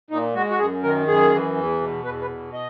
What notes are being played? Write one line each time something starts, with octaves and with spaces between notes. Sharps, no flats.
A#2 D#4
G#3 F#4
F#4
F#2 G#4
D#3 A#4
F#2 G#4
E3
E2
B2
E2 B4
B4
B2
D#5